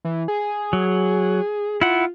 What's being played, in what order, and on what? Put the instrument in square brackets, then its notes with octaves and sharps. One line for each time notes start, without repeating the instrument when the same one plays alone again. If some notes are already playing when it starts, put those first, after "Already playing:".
[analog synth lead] E3
G#4
[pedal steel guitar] F#3
[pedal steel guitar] E4 F#5 [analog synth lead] F4